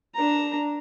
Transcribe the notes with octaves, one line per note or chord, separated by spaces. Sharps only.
D4 A#5